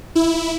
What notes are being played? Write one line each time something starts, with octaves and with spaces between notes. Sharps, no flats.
E4